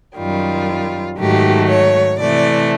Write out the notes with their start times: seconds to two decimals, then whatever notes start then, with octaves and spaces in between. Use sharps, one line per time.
0.16 F#2 D#3 G3 F4
1.18 G#2 D#3 F#3 A3 G4
1.69 C#5
2.20 C3 E3 A3 D5